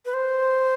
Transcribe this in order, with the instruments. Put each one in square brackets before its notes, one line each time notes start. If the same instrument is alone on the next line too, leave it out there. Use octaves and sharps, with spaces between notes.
[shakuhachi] B4
C5